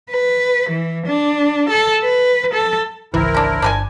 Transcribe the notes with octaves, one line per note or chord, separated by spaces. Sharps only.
B4
E3
D4
A4
B4
A4
G#1 C#2 E3 C4 E4 A#4
C#4 D4
G1 D4 B4 G#5